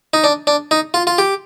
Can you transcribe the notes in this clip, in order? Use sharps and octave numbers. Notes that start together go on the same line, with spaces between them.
D#4
D4
D4
D#4
F4
F4
G4